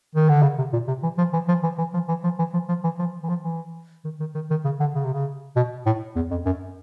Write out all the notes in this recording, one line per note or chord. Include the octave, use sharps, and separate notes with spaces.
D#3
D3
C#3
C3
A#2
C3
E3
F3
E3
F3
E3
E3
F3
E3
F3
E3
F3
F3
E3
F3
E3
F3
E3
D#3
D#3
D#3
D#3
C#3
D3
C#3
C3
C#3
B2
A2
E2
F2
F#2